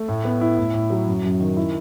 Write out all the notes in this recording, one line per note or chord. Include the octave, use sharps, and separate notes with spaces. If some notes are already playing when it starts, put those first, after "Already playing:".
Already playing: A3
A2
B3
E4
A2
A2
F#3
F#2
F#2
D#3
E4